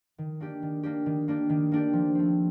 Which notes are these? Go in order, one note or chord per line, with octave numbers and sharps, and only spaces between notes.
D#3
A#3 D4 G4
D#3
A#3 D4 G4
D#3
A#3 D4 G4
D#3
A#3 D4 G4
F3
A3 C4